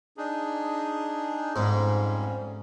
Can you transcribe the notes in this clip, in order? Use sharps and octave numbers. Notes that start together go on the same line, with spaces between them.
D4 D#4 G#4
F2 G#2 G3 C#4